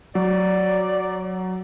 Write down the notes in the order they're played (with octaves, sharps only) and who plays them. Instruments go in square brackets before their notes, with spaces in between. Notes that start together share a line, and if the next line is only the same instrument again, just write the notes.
[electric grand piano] F#3 [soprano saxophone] D5